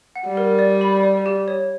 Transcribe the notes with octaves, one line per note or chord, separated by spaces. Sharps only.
F#5
G3
A#4
D5
B5
D5
G4
C#5